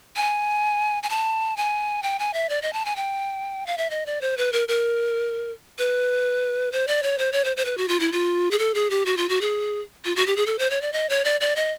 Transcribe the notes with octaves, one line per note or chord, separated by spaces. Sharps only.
G#5
G#5
A5
G#5
G5
G#5
E5
D5
D#5
A5
G#5
G5
F5
E5
D#5
D5
C5
B4
A#4
A#4
B4
C5
D5
C#5
C5
C#5
C5
C5
B4
F#4
F4
E4
F4
G#4
A4
G#4
G4
F#4
F4
F#4
G#4
F4
F#4
G4
G#4
A4
C5
C#5
D5
D#5
C#5
D5
D5
D#5